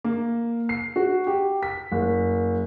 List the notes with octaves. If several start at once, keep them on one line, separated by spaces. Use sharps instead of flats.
A#3
C7
F#4
G4
B6
F#1